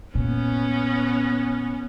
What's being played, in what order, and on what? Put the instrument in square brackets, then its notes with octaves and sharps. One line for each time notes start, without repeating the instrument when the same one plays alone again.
[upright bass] A#2 [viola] B3 C#4